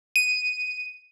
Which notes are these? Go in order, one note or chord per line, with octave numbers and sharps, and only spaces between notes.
D#7